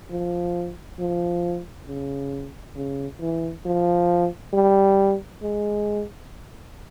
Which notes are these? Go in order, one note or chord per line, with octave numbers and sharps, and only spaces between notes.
F3
F3
C#3
C#3
E3
F3
G3
G#3